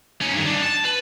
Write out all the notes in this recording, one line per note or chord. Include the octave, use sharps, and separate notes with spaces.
C#4 D#4
G2 D#3
D4 D#4
A5
B4